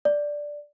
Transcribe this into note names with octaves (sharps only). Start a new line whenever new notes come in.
D5